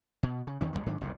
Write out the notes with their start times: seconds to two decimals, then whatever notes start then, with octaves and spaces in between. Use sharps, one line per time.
0.23 B2
0.47 C#3
0.61 E2 D#3 C#4
0.73 C2 F2 G3 G#3
0.86 G#2 D#3 F#3 D4
1.01 F#1 C2 F2 A#2